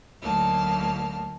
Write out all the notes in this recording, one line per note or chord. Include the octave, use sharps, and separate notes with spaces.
D2 F#3 A#3 D#4 A5 F6